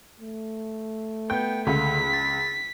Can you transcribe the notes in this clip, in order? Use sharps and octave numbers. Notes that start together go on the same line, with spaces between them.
A3
B3 G5 G6
C#2 D3 B6
A6